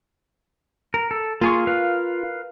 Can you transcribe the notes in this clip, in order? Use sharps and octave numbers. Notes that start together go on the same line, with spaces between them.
A#4
A4
A#3 F4 G#4 C#6
A#4 B4 F5